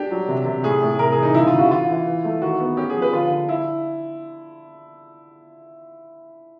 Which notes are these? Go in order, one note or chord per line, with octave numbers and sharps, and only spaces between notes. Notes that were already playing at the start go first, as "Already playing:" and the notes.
Already playing: D4 G4
F#3
C3
C3
A2 G#4
A2
C3 A#4
G#4
E3
D#4
C#3 E4
F4
C#3
F#4
E3 F4
E3
E3
A3
D#3 F#4
B3
C#4 G4
G#4
F3
B4
D3 F4
D3
E4